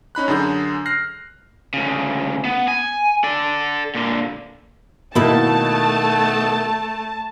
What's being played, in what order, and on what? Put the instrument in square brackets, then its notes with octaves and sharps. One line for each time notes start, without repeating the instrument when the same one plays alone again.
[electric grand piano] C#4 D#4 B5 F#6
F#2 D3 G#4 G6
F6 F#6 A#6 C7
[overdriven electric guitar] D2 C#3
B3
G#5
A4 D5
A#2 D3
[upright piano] B2 [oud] D#3 A#3 E4 [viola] A3 [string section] A5